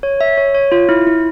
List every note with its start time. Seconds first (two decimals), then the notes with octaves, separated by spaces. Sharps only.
0.03 C#5
0.21 E5
0.38 C#5
0.55 C#5
0.72 F4
0.89 E4
1.07 E4